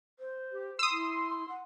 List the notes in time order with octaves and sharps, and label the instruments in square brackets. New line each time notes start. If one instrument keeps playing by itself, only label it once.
[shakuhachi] C5
[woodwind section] G4
[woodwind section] C6 [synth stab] D#6 E6
[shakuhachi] E4
F#5